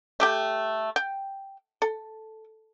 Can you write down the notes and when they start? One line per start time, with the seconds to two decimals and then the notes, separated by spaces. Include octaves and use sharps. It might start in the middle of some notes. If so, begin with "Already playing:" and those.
0.20 A3 G4 G5
0.96 G5
1.82 A4